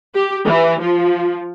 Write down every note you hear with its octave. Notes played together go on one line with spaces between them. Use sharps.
G4
E3
F3